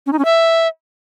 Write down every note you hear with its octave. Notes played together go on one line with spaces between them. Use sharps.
C#4
D#4
C#4
E5